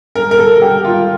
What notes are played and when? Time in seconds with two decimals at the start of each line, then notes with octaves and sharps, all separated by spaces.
0.15 A#4
0.31 A#4
0.39 A4
0.62 G4
0.85 F4